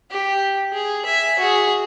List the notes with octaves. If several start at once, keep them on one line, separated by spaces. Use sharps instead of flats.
G4
G#4
E5 G#5
F#4 G#4